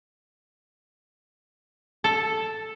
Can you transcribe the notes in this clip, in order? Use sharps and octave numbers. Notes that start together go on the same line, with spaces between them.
A4